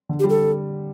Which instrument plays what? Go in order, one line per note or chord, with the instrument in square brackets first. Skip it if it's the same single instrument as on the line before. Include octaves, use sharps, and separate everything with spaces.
[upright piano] D3
[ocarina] G4
[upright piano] G3
[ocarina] A4